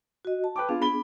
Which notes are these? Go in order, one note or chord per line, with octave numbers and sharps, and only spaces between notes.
F#4 D#5
A5
B4 G5 D6
B3 D4 F4 G#4
B5 G7